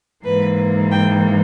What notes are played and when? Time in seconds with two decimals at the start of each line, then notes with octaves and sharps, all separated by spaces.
0.25 G#2 E3 A#3 B4
0.92 G5